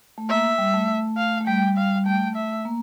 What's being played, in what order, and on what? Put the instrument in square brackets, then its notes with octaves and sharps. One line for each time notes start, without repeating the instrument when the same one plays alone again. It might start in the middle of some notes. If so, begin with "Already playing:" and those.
[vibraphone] A3
[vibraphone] A#3 [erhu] E5
[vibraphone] G3
A3
[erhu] F5
[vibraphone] A3
[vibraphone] G3 [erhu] G5
[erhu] F5
[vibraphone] G3
[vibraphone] A3 [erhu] G5
[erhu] E5
[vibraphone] A#3